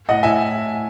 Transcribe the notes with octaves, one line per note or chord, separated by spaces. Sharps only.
A2 D#5 F#5
A2 E5 G#5